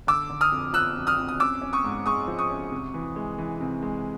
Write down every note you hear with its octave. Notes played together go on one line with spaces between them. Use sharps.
D3 D6 E6
D3
D#6 F6
F2
F3 E6 F#6
F2
D#6 F6
F2
D#6
C#4 D6 E6
C#4
C#6 D#6
G#2
G#3 C#6 D#6
F3
C#6 D#6
C#4
C3
E3
G#3
E3
C3
G#3